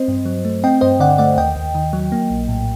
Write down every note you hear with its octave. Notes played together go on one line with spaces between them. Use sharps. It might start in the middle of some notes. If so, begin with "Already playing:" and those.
Already playing: C4 C5 D#5
G2
F#3
A3
C4 D#5 G5
G2 C5 D#5
D3 D5 F#5
A3 D5 F#5
D#2 D#5 G5
D#2
D#3
F#3
A#3
A#1
A2